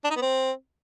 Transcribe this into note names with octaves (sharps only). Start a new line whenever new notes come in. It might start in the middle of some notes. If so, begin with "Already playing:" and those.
D4
D#4
B3
C4